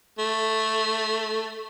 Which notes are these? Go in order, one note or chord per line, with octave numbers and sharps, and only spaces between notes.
A3